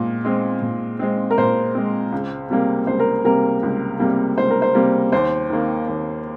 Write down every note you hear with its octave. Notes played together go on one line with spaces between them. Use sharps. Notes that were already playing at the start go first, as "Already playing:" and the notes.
Already playing: A#2 G#3 C4
G#3 C4
A#2
G#3 C4
A#4
A#2 C5
G#3 C4
C#2
C3 G3 A#3
C#2 C5
A#4
C3 G3 A#3 A#4
C#2
C3 G3 A#3
C#2 C5
A#4
C5
C3 G3 A#3
D#2 C5
D#3 A#3
D#2